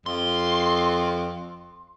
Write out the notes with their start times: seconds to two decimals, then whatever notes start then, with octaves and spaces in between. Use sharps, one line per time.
0.06 F2 C6